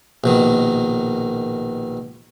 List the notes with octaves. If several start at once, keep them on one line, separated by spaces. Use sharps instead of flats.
A#1 B2 D#3